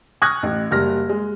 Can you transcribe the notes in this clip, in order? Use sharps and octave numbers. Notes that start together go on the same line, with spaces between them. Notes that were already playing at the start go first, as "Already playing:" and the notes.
C#6 D#6 F6 F#6 G#6 A#6
A1
F#1 G3 F6 A#6
G#3